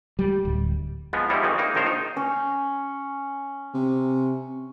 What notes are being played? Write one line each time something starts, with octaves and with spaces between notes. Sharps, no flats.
G3
D1
F3 G#3 B3
E3 F3 G3 G#3 D#4 E4
F2 D#3 E3 G#3
A#3 D#4
A#1 D#3 F3 A#4 C5 C#5
D#4
C#4
C3